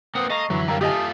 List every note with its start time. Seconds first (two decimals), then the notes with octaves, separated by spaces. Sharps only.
0.15 A#3 C4 B4 C5 F#5 D#6
0.30 A4 D#5 F5 A#5 C#6
0.50 F#2 D3 E3 F#3
0.68 G3 A3 E4 A#4 C#5 F5 A#5
0.81 A3 F4 G4 D#5 G#5 A5 D6 D#6